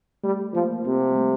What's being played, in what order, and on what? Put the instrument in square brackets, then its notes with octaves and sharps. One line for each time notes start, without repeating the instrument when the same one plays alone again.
[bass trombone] G3 [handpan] A3
[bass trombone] F3 [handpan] A#3
[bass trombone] C3 [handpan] C4
[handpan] G3
A3